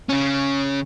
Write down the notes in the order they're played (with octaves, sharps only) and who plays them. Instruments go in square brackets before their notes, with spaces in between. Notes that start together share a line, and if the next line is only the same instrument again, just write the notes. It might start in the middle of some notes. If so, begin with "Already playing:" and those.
[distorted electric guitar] C#3 C#4